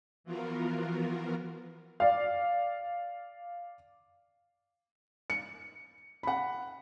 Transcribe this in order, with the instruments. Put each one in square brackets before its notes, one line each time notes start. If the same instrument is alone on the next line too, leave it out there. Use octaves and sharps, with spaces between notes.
[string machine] E3 F3 B3 F4 F#4 A#4
[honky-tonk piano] D5 F5
[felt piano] C#7
F#5 B5